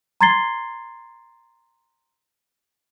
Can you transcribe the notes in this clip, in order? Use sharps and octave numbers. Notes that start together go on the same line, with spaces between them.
A#5 C6 G#6 A6 C7 G7